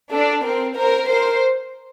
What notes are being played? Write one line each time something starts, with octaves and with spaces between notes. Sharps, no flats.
D4 A4
C4 A#4
A#4 C5
A#4 C5